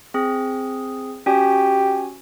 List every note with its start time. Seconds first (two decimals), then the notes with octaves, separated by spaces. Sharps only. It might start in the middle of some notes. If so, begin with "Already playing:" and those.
0.14 C4 G#4
1.26 C#4 F#4 G4 G#5